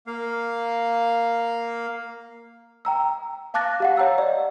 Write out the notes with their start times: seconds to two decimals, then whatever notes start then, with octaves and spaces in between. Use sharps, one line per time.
0.07 A#3 F5
2.85 G5 A#5 E6
3.54 F5 A5 D6 F#6 A6 A#6
3.80 G4 F5 F#5
3.96 C#5 F#5 A#5 E6 A6
4.18 D5 D#5